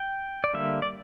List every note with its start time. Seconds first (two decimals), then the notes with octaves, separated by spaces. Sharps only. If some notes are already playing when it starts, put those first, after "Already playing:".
Already playing: G5
0.44 D5
0.54 D3 G3 A#3 E5
0.82 D5